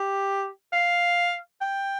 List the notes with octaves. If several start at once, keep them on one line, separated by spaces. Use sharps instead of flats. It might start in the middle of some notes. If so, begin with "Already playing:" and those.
Already playing: G4
F5
G5